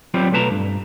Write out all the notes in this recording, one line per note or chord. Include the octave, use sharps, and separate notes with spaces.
F#3 G3 B3 C4 F4 G4
B1 A3 B4 A5 A#5
G2